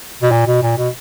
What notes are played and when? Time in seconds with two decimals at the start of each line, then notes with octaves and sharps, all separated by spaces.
0.22 B2
0.31 A#2
0.46 B2
0.62 A#2
0.77 B2